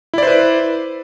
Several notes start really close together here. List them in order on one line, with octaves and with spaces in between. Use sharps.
E4 D5 C5 B4